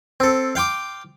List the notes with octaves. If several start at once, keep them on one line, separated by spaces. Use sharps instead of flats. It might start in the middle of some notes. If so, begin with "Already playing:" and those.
C4 A4
F5 G5 C6 D6